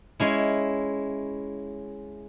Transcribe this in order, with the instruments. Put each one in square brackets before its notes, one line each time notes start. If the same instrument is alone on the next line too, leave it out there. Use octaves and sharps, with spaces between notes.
[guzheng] G#3 C#4 E4